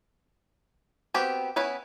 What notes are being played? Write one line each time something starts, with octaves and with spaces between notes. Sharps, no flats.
B3 C4 F#4 G4 B4
B3 C#4 E4 B4 C#5